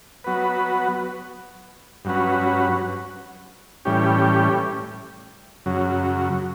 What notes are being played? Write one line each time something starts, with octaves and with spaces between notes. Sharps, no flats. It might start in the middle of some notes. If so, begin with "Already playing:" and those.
F#3 B3 F#4 B4
G2 F#3 C#4 F#4 B4
A2 E3 G3 C#4 G4
F#2 C#3 F#3